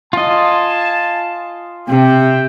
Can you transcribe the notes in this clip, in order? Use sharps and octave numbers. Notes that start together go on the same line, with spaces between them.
F4 D#5 G#5 A5
C3 E5 G5